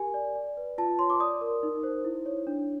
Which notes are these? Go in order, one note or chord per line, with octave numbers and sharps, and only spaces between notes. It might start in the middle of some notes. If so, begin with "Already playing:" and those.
Already playing: G4 A#4 G#5
D5
D5
B4
F4 A5
C#5 C6
D6
D5 D#6
A#4
D#4
C5
E4
C#5
D4